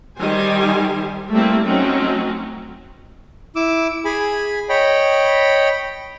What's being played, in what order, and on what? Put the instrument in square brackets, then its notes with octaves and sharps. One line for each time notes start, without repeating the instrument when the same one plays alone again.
[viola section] D#3 G3 C5 G#5
G3 A3 A#3 C4 E4
F#3 A3 C4 C#4 D#4
[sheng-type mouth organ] E4 D6 E6
G#4 G#5 B5
C#5 D#5 G5 B5